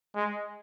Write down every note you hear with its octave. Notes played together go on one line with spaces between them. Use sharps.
G#3